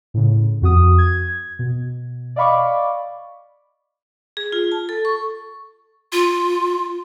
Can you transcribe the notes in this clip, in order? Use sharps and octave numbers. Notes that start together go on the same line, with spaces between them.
A2 C#3
F2 F#4 D#6
G#6
B2
D5 D#5 F5 B5 C#6 D6
G#4
F4
A5
A4
C#6
F4